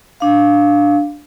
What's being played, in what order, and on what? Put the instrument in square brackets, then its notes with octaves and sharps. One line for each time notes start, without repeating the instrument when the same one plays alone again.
[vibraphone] D4 F5